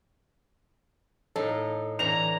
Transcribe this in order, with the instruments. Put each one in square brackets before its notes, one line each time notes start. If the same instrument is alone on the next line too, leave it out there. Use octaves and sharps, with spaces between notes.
[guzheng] A2 D#4 F5 [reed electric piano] A4
[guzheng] D3 E3 [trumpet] A#5 [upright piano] F7